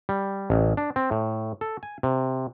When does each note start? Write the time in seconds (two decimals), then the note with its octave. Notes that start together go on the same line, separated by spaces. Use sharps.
0.09 G3
0.50 A1
0.77 D4
0.96 C4
1.11 A2
1.61 A4
1.83 G#5
2.03 C3